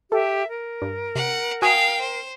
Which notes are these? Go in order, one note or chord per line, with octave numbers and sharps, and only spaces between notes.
G4 A4 E5
A#4
G2
C3 F#5
F#4 F5 G5 G#5 D#6
C5